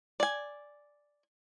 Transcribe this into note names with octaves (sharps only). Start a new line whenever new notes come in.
D5 G#5